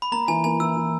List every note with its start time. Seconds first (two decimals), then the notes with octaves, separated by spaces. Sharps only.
0.02 B5
0.12 A#3 A#5
0.28 E3 G#5
0.44 A#3 G#5
0.60 E3 E6
0.76 E3